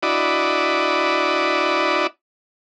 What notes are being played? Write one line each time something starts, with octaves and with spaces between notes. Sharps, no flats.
D4 E4 F#4 D5 D#5 B5